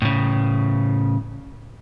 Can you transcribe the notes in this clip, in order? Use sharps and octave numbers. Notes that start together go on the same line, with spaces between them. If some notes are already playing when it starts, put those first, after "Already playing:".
A2 C#3